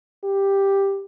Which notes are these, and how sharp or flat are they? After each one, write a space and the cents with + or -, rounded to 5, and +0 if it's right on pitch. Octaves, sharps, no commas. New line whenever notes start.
G4 +5